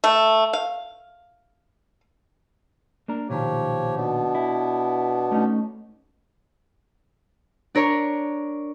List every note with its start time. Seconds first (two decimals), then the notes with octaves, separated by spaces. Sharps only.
0.04 A3
0.53 F5
3.08 A#3 D4 A#4
3.29 B1 A#2 D#3 F3 G4 C#5
3.95 B2 B3 D4
4.35 E4
5.31 A3 C#4 D#4
7.75 D4 A#4 C#5 C#6